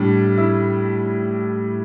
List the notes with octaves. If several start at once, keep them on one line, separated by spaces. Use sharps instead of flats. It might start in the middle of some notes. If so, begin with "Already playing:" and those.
Already playing: A2 G3 D4
E4